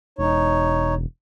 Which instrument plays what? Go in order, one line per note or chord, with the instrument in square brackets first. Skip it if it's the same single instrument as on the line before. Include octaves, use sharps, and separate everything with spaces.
[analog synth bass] E1 [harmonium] D#4 C#5